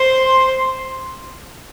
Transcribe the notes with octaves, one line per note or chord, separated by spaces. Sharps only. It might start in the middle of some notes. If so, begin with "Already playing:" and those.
Already playing: C5
C6